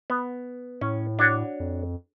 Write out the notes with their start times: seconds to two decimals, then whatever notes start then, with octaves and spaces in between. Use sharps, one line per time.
0.10 B3
0.81 A2 C#4
1.19 D4 F#4 C#5
1.60 F2